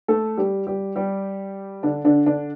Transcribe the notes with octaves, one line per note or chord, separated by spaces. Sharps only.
A3 A4
G3 G4
G3 G4
G3 G4
D3 D4
D3 D4
D3 D4